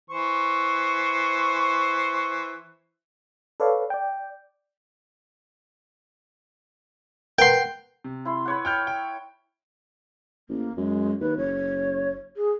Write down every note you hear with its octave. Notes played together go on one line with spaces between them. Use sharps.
E3 C5 C#6
A4 B4 C#5 D5 F5
D5 G5
A#4 B4 F#5 G5 C6
C3
E4 C6
B4 C#5 F#5
G5 F6 G6
G5
A1 A#3
F#2 G#3
D#2 B4
F#1 C#5
G#4